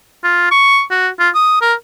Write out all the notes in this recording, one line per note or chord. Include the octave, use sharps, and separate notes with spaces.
F4
C#6
F#4
F4
D#6
A#4